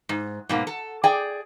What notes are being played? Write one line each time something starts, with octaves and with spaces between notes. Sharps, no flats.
G#2
G#2 B2 A#3
A4
G#4 D5 G5